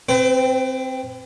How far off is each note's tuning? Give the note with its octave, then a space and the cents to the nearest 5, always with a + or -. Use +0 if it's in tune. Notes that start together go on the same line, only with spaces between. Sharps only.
C4 +0 B4 +45